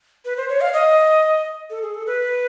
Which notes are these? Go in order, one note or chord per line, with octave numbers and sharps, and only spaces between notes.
B4
C5
C#5
F5
D#5
A4
G#4
A4
B4